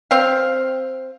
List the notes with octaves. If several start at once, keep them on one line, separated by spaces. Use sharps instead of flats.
C4 F5